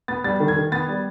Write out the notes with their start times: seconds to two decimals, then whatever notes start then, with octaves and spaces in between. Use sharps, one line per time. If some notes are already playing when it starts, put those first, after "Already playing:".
0.08 B3 A6
0.24 G3 A6
0.40 D#3
0.48 G#6
0.56 D#3
0.72 B3 A6
0.88 G3